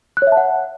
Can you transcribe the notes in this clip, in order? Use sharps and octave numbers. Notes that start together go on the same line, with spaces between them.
F#6
C#5
E5
A5
F#5